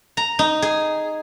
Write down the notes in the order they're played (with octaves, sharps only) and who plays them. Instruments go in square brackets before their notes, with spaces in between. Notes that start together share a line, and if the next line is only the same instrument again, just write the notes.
[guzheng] A#5
D#4
G#4